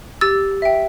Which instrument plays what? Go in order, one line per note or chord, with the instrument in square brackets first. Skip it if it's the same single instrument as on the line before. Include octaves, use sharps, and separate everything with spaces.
[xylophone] G4 E6 A6
E5 G5